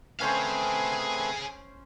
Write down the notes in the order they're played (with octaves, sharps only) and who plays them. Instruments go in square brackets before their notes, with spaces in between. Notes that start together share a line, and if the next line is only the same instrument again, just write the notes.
[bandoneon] A3 C4 B4 [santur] C#4 C5 [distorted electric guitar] G#4 F5 [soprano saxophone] G#5